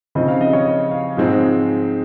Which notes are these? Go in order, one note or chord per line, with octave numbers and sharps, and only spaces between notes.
C#3 F3 C4 D#4 D#5
F5
D#5
C#5
D#5
F5
G#2 F3 G#3 C4 D#4